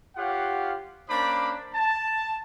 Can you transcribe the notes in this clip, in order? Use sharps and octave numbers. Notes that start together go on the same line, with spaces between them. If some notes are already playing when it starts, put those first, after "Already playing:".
F4 G4 C#5 F5 F#5
A#3 C#4 D4 C5 B5 D6
A5